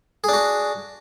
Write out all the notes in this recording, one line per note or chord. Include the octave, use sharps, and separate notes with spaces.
D4 F#4 G#4